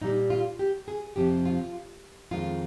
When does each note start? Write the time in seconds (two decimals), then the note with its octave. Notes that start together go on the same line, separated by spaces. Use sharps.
0.02 A#2 G3 D#4
0.30 F4
0.59 G4
0.88 G#4
1.16 F2 C3 F3 G4
1.45 F4
2.31 F2 D#3 G#3 F4